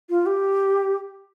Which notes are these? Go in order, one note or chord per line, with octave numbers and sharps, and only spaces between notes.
F4
G4